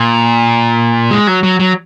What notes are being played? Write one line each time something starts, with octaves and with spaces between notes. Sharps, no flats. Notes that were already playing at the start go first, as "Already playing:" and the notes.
Already playing: A#2
G#3
F#3
F#3
F#3